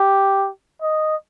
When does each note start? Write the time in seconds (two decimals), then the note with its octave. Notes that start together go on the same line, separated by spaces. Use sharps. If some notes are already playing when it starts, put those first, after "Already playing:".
Already playing: G4
0.82 D#5